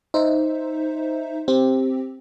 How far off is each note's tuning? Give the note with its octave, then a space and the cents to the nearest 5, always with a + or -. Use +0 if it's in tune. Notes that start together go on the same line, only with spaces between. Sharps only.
D#4 +5 C5 +0 E5 +0
C4 +5 G4 +0